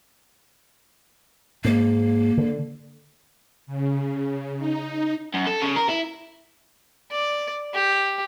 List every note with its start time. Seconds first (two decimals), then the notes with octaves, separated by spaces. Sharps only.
1.65 G#2 A#3
2.38 D3
3.67 C#3
4.58 D#4
5.34 F#2
5.47 A4
5.62 C#3
5.76 A#4
5.90 E4
7.12 D5
7.74 G4